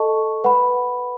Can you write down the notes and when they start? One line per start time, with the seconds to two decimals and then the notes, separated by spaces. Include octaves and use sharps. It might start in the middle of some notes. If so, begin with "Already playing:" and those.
Already playing: A4 D#5 A5 C#6
0.44 B4 F#5 B5